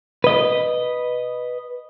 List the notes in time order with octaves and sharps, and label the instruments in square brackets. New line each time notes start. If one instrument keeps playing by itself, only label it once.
[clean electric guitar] B4 D#5